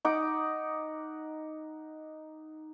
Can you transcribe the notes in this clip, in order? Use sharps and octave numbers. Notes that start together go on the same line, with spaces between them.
D#4 F#5 D6